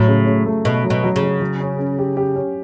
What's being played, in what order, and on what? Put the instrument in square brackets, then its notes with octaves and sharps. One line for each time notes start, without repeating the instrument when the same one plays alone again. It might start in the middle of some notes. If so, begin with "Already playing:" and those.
Already playing: [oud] A2 [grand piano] F#3
[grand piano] C#3
C#3
A3
[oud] B2 [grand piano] A3
[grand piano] F#3
[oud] B2
[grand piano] F#3
[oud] C#3
[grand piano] F#3
F#3
C#4
C#4
G4
G4
C#4